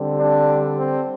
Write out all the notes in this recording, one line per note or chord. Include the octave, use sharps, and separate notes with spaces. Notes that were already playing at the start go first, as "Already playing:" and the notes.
Already playing: D3 G3 C4
D4
C4